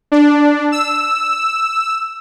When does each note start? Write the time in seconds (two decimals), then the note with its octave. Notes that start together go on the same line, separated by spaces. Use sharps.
0.12 D4
0.72 E6